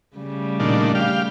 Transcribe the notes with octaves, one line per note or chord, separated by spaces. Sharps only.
C#3 G3 A3
A#2 D#3 D4
G4 F5